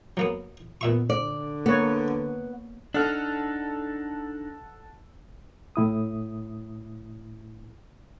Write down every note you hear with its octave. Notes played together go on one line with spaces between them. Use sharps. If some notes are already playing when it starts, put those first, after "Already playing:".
F#3 A#3 B3
A#2 B3 E5 C#6
D3 D5
A#3 B3 C#5
D4 D#4 A4 F#5 F6
A2 E4 D#6